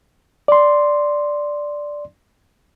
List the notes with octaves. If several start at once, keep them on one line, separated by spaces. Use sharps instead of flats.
D5 C6